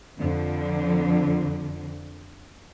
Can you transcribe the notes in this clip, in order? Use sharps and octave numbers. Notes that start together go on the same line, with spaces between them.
F2 D3 F3